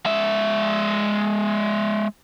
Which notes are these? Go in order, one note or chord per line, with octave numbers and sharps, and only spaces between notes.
G#3 E5